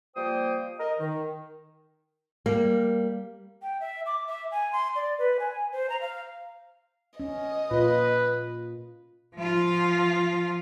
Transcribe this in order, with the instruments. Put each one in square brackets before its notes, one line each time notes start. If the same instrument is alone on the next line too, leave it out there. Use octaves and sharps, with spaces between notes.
[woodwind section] F3 G3 A#3 C5 G5 D#6
A#4 D#5
D#3
[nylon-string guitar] G3 A#3
[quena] G5
E5
D6
E5
G#5
C6
D5
B4
G#5
C5
A#5
F5
[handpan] C#4 [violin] D#5
[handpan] A#2 F4 [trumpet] B4
[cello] F3 F4